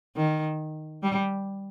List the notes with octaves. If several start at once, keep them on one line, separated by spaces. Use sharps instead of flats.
D#3
G3